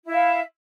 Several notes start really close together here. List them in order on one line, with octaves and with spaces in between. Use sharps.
E4 E5 F5